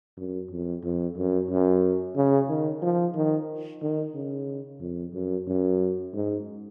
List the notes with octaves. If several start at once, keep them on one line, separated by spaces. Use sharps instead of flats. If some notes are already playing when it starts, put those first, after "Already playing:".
F#2
F2
F2
F#2
F#2
C#3
D#3
F3
D#3
D#3
C#3
F2
F#2
F#2
G#2